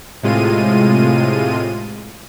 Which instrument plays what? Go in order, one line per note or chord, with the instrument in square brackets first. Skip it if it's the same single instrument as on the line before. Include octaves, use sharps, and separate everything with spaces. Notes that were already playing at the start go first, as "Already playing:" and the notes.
[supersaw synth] A2 C3 G#3 F4 D#7